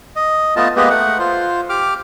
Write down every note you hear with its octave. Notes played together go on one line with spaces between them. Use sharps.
D#5
A3 B3 F4 D#5 A5
G#3 A#3 B3 G4 B4 D#5
A3 F#5
F4 C5
G4 D6 F6